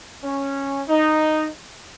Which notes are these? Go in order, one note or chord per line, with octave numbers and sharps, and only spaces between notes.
C#4
D#4